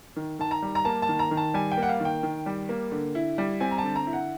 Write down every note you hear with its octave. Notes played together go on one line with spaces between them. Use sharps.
D#3
D#3 A5
A#5
G3
A#5
A#3 A5
A5
D#3
A#5
D#3
A5
G3 G#5
G5
A#3
F#5
F5
D#3 G5
D#3
G3
A#3
D3
E4
G3
C4 G#5
A#5
A5
D3
A#5
E4
F#5